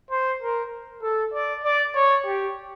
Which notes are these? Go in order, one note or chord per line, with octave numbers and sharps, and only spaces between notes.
C5
A#4
A4
D5
D5
C#5
G4